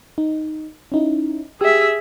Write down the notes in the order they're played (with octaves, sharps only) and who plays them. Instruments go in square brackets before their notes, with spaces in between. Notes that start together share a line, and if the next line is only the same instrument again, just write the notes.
[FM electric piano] D#4
C#4 D#4 E4
[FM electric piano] G4 E6 [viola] G#4 E5